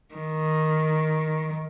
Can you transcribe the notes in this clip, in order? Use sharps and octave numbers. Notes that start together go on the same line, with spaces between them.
D#3